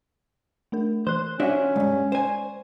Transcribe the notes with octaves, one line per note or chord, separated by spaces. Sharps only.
A3 D4 A#4
E3 C5 F#6
C#4 D4 F#4 D5 E5 F#5
B1 G2 G#3 D5
C5 G#5